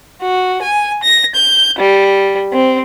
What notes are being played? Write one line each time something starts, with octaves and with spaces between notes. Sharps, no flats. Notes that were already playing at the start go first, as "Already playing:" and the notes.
F#4
G#5
A#6
G6
G3
C4